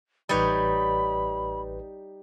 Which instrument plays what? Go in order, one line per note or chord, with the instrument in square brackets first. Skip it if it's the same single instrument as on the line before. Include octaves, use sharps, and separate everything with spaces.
[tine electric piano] A1 B4 D5 [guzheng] G3 D#4 C#5 [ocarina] B5